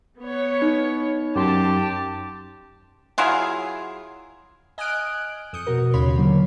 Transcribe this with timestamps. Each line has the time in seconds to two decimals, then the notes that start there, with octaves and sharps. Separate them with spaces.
0.20 B3 C#5
0.62 D#4
1.36 F#2 G4 A5 C6
3.18 F#3 E4 F4 G#4
4.78 D#5 G#5 D#6 F6 F#6 D7
5.53 F2 D#6 G6 C#7
5.67 B2 F#4 A#4
5.94 D#2 C#3 C#5 B5 C6
6.16 D3 F3 F#3 A#3